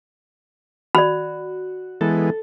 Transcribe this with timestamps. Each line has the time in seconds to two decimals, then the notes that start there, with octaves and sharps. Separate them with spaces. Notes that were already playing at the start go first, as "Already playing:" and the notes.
0.95 F#4 D5 B5
2.01 E3 G#3 B3 A4